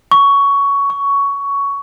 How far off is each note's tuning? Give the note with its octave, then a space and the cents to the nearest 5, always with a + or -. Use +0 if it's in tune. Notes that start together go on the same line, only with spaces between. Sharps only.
C#6 +15
C#6 +10